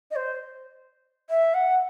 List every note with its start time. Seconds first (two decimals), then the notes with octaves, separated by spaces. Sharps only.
0.11 D#5
0.16 C5
1.30 E5
1.54 F#5